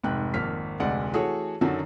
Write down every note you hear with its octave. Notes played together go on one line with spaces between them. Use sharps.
F1 G#2 G5 F#6
G#1 F2 A#3 F6 B6
F1 D2 G#3 D5 F#5
E3 A3 F#4 G#4 A4 C#5
F#2 D3 D#3 F#3 F#4